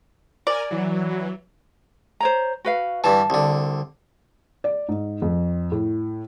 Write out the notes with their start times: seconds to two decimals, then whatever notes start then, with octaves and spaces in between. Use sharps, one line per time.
0.47 A#4 D5 G#5
0.71 E3 F#3
2.20 C5 C#5 A#5
2.65 F#4 B4 F5
3.04 G2 E3 A5
3.30 C2 D3
4.64 D5
4.89 G#2
5.22 F2
5.72 A2